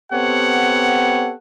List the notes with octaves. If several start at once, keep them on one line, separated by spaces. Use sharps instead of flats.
B3 C4 G4 A4 C#5 F#5